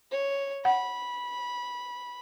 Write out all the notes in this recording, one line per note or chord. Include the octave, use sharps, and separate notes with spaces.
C#5
F#5 B5